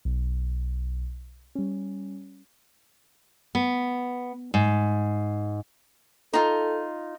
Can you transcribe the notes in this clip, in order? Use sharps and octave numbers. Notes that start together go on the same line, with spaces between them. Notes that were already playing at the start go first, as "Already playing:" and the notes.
B1
G3 C#4
B3
G#2
D#4 F4 A4